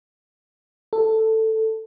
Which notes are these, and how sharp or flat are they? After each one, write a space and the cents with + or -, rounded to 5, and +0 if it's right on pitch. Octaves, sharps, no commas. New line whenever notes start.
A4 +10